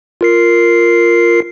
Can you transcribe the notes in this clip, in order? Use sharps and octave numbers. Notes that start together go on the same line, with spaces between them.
F4 A#4 C7